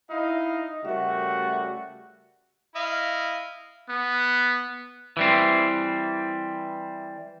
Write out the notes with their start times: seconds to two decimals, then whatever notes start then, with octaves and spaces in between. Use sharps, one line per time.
0.10 D#4 E4 F5
0.85 C#3 G3 A3 F#4 A#4 E5
2.75 E4 D#5 F5
3.89 B3
5.17 E3 G3 C4